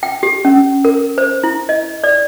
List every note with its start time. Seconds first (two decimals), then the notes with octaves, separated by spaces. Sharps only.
0.03 G5
0.23 G4
0.45 C#4
0.85 A#4
1.18 C5
1.43 E4
1.69 D#5
2.04 D5